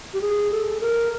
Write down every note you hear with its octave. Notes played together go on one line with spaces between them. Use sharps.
G4
G#4
A4
A#4